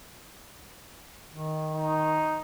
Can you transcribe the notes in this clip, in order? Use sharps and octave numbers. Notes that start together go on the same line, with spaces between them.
D#3
D#4